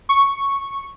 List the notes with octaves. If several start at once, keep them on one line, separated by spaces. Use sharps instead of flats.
C#6